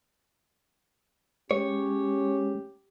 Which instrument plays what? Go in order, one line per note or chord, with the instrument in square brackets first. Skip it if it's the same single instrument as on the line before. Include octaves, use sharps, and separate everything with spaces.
[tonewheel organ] G#3 [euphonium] C#4 [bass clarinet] G4 [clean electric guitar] C#5